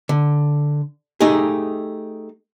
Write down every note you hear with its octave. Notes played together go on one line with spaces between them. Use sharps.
D3
A3 D#4 G4 G#4